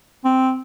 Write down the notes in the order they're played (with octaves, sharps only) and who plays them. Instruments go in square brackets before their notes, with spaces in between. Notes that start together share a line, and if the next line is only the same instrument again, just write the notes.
[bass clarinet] C4